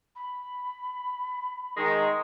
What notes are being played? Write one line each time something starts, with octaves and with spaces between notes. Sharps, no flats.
B5
D#3 G#3